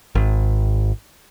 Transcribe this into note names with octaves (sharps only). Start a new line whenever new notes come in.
G#1